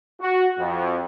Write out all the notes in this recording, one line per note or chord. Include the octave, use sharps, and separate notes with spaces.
F#4
F2